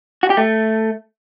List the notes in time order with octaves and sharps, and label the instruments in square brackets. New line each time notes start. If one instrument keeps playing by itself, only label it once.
[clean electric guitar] F#4
G4
A3